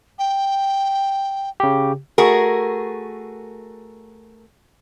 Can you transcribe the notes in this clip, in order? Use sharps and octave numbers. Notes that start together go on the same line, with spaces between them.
G5
C#3 G4
A3 F#4 G#4 A#4